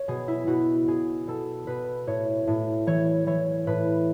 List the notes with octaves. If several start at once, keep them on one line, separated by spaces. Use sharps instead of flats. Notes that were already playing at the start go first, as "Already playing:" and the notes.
Already playing: C#5
B2 G#4
E4
B2 F#4
B2 G#4
B2 A4
B2 B4
A2 C#5
A2
E3 C#5
E3 C#5
A2 B4